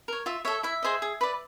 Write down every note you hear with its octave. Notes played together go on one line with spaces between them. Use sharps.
A#4 C#5
F4 E5
A4 C#5 E5
E4 E5
G#4 C5 D#5
G#4
B4 D5